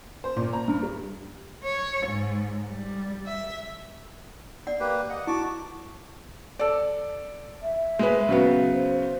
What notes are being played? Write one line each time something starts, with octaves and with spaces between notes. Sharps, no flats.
C5
A#2
A#5
G2
G3
C#5
G#2
G3
E5
D5 F#5
A#3 G4 B4
D#5 F#5
E4 F#4 A5 D6
A4 D5
E5
G#3 B4
C#3 F#3 B3
C5